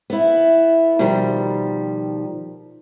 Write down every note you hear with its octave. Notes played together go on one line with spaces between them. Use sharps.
B3 E4
B2 D#3 F3 G3